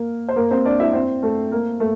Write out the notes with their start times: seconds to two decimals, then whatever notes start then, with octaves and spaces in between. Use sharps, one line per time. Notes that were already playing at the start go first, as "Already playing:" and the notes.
Already playing: A#3 A#4
0.28 C5
0.36 A#3 A#4
0.51 C4 C5
0.65 D4 D5
0.80 E4 E5
0.93 C4 C5
1.23 A3 A4
1.51 A#3 A#4
1.80 A3